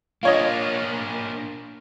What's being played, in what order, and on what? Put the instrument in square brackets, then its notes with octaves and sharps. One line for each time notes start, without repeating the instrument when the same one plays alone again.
[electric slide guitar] A#3 D4 [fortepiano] F4 C#5 D#5